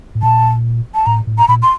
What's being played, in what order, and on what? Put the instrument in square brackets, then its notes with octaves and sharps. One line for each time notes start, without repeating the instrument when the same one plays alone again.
[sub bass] A2
[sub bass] A#2 [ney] A5
[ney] A5
[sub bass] A2 [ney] A#5
[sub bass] A2
[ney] A#5
[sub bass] A#2 [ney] B5
[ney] C6